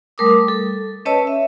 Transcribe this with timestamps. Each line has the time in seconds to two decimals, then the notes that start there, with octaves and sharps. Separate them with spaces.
0.18 G3 A3 A#4 D6 D#6
0.48 A4
1.05 C#4 B4 C#5 D#5 A5 E6
1.27 E5